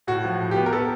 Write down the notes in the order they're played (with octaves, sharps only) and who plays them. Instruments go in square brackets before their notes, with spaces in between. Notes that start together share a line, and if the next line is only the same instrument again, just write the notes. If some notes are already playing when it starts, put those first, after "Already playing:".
[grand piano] A2 F#4
F3
A2
B3 G4
A#4
B3 A4